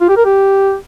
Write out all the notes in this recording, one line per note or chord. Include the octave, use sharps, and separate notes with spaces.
F4
G4
A#4
G4